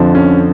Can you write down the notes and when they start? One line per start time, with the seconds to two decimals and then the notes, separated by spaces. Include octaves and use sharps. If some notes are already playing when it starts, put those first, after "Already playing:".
Already playing: F2 D3 F3
0.15 C#4